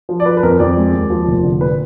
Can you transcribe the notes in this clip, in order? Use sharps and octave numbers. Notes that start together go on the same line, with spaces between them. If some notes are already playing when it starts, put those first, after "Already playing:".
F3
D5
F3 B4
B4
F2 A#4
F2 D5
G#3
D#2
F3
F1
D3
A#2 B4